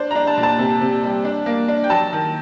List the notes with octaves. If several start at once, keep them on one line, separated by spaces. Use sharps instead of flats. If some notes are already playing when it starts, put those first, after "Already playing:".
Already playing: D4 C5
D4 A#5
A5
A#2
A5
C3
C3
G3
D4
A#3
D4
G5
F#3 A5
D#3